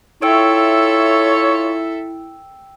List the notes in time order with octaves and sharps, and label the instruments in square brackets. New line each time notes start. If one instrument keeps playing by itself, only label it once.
[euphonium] E4 [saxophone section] F4 C#5 [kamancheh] A4 E5 [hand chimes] G5 E6 D7